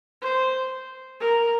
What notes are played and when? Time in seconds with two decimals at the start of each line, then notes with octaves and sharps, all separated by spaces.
0.22 C5
1.20 A#4